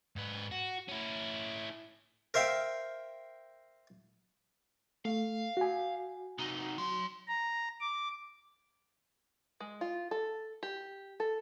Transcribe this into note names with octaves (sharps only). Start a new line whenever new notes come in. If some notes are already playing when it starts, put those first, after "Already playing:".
G#2 B4
F#4
C#4 E4
A#4 C5 E5 F5 G5
A3 F5
F#4 G#5
C3 D#4
F#3 C6
A#5
D6
G#3
F4
A4
G4
A4